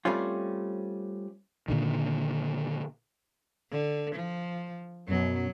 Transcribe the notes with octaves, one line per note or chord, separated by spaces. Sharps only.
G3 A3 C4 C#4 F4
A#2 D3 D#3
D3
F3
F#2 B2 F#3